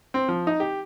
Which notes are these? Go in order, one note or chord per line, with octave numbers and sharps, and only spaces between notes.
C4
F3
D#4
G4